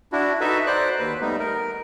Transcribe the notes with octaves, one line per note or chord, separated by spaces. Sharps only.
D4 E4 F#4
D#4 F#4 A4 B4 E5
C5 D5 F#6
D#2 B4
G3 A3 B3 D#4
A#4